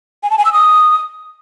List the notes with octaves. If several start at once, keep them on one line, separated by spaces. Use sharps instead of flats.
G#5
A5
G#5
E6
D#6